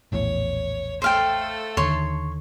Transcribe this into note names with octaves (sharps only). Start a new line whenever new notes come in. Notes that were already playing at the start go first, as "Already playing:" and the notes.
A#1 E2 A2 C#5
A3 A4 C5 F5 G5
D#2 D3 D#3 C#5 C6